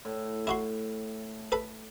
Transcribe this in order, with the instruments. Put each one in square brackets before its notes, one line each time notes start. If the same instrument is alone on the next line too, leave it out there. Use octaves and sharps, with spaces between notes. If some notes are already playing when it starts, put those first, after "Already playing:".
[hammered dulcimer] A2
[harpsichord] E4 F#4 C6
A4 B4 B5